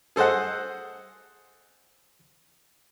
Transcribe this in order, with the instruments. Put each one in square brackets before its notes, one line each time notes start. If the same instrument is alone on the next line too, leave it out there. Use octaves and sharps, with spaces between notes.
[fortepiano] G#4 A4 C5 D#5 F#5